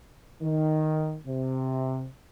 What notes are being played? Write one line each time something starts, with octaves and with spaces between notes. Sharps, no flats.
D#3
C3